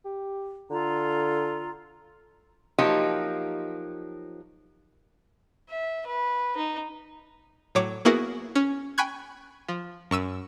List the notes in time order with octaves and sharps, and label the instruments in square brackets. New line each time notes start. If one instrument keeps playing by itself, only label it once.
[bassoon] G4
[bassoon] D3 [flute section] F4 A4 A#5
[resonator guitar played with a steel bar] F3 F#3 A#3 D#4 G4
[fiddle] E5
B4
D#4
[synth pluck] A2 F#3 C#5 D6
A#3 B3 E4 F#4 G#4 A#4
C#4
G5 G#5 B5 C#6 F#6 G#6
F3
F#2 C#6 E6 D#7